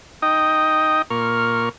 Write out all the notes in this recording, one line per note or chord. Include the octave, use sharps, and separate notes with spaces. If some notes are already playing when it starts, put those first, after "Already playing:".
D#4 D#5 G5 D#6
A#2 A#4 C#6 F6